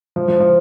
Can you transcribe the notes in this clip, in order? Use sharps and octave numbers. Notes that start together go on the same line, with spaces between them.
F3
F3
F3